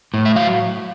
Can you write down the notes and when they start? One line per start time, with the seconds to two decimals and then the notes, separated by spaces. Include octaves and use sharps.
0.14 A2
0.25 E5
0.36 F#3 F5